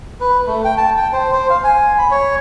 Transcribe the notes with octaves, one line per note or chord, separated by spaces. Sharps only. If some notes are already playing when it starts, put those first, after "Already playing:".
B4
A3
G5
A5
G5
C5
C5
F5
G#5
B5
C#5